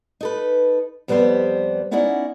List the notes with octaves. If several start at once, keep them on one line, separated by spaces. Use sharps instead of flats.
D#4 A4 B4
F2 G3 B3 B4 C5 D5
B3 C#4 D#4 E4 D5 F#5